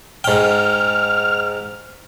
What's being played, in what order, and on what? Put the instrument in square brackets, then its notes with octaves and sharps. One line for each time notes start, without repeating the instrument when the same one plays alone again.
[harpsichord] G#2 G5 [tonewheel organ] F6